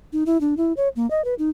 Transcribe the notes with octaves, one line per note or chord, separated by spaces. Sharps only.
D#4
E4
D4
E4
C#5
A#3
D#5
B4
D#4